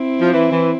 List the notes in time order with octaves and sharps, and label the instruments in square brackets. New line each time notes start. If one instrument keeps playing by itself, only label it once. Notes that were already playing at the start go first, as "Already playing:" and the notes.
Already playing: [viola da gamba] C4 E4
[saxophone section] F3
E3
E3